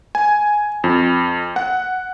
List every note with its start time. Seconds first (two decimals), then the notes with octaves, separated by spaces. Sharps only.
0.15 G#5
0.84 F2
1.56 F#5